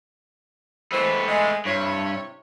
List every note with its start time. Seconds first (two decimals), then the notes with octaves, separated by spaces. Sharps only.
0.92 E3 G#3 A3 B3 C4
1.27 G#3
1.65 G2 C3 E4 C#5